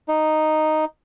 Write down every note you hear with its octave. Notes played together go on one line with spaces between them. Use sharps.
D#4